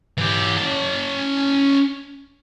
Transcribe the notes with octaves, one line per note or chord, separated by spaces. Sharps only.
E3 G4
C#4 A5